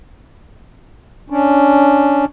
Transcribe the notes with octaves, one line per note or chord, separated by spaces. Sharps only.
C#4 D4